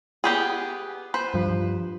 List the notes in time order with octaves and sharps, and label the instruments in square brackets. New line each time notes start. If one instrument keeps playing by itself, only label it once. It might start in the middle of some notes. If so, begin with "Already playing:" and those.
[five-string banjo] B3 G4 G#4
B4 C5
[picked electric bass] G2 F3